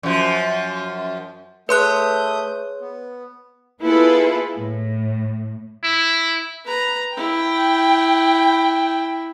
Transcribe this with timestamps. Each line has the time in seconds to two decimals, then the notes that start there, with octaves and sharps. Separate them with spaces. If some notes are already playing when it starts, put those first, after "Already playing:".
0.03 F#2 F3
1.69 A3 G#4 B4 C#5 C6 D#6 F#6 G6
2.81 B3
3.81 B3 E4 F4 G#4 A4 B4
4.55 A2
5.83 E4
6.65 B4 A#5
7.17 E4 G5